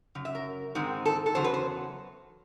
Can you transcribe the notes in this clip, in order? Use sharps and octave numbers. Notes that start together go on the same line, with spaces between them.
F#2 C#3
E5
A#4
G#2 D#3 G#3 C4
A4
A4
E2 C#3 F#3 C5
B4
C5